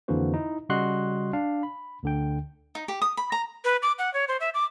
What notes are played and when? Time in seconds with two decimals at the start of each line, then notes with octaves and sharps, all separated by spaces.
0.08 F2 D3 E3 A#3 F#4 C5
0.34 D#4 E4
0.69 C#3 G3 F#4 D#5 C6 F#6
1.33 D4 F5
1.63 B5
2.03 D2 D3 G5
2.75 D#4
2.88 G4
3.02 D#6
3.17 B5
3.32 A#5
3.64 B4
3.82 D6
3.99 F#5
4.14 C#5
4.28 C5
4.40 E5
4.54 D6